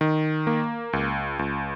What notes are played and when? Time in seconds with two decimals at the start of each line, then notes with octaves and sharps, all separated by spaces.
0.01 D#3
0.47 A#3
0.93 C#2
1.39 C#2